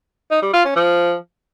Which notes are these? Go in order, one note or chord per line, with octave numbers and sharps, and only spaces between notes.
D#4
G3
F4
C#4
F3